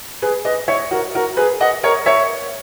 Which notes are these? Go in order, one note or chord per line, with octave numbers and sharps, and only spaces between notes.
G#4 B4
B4 D#5
C#5 E5
F#4 A#4
F#4 A#4
G#4 B4
D#5 F#5
A#4 C#5
C#5 E5